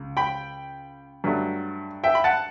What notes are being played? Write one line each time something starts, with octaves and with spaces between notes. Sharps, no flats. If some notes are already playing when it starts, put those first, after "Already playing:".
Already playing: C#2
G5 B5
G2 F#3 A3
E5 G5
B5
F#5 A5